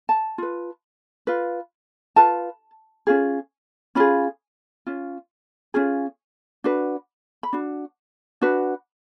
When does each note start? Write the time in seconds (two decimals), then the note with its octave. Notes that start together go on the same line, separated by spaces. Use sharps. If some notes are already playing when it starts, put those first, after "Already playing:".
0.09 A5
0.38 F4 B4
1.27 F4 B4
2.16 F4 B4 A5
3.07 C#4 F4 G#4
3.95 C#4 F4 G#4 B5
4.87 C#4 F4
5.74 C#4 F4 G#4
6.64 D4 F#4 B4
7.43 B5
7.53 D4 F#4
8.41 D4 F#4 B4